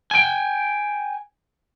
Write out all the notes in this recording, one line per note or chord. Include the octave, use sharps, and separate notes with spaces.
G5 G#5